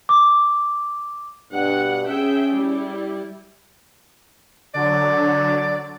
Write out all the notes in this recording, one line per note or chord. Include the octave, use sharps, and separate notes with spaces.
D6
G2 B2 F#5
C#4 G#4 E5 G5
G3 E4
D3 F#3 D5